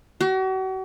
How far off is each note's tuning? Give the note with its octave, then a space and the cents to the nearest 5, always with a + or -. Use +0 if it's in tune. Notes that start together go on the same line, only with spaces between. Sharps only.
F#4 +40